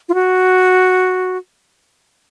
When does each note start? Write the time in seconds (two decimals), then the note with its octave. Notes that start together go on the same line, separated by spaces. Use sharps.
0.09 F4
0.14 F#4